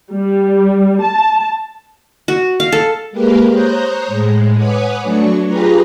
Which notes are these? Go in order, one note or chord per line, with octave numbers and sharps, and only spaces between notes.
G3
A5
F#4
F5
A4
G#3 A#3 G4 A#4 B4 F5
C5 C#5 A#5 D#6 F#6 G6
A2 G#3
B4 C#5 F#5 G#5 D6 D#6
F#3 A3 D4 C#6
F4 G4 G#4 B4 A#5 B5